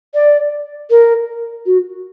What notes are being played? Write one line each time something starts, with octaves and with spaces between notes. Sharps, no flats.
D5
A#4
F#4